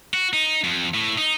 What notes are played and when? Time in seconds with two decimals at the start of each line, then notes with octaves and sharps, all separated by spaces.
0.14 F#4
0.33 D#4
0.64 F2
0.94 A2
1.18 D#4